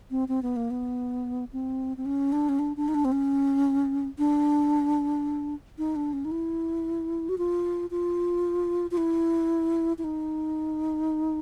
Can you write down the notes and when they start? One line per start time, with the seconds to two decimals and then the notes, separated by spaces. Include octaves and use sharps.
0.11 C4
0.28 C4
0.43 B3
0.56 A#3
0.70 B3
1.53 C4
1.97 C4
2.06 C#4
2.32 D4
2.49 C#4
2.59 D4
2.77 D4
2.88 D#4
2.94 D4
3.05 C4
3.12 C#4
4.18 D4
5.78 D#4
5.96 D4
6.13 C#4
6.25 D#4
6.31 E4
7.29 F#4
7.38 F4
7.91 F4
8.91 F4
8.97 E4
9.98 E4
10.04 D#4